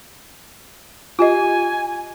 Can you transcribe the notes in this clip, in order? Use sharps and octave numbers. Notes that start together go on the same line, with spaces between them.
F4 G4 D#5 G#5